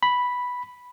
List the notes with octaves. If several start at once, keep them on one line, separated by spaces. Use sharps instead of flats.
B5